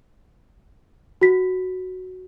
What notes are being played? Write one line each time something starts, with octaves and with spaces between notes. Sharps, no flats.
F#4 B6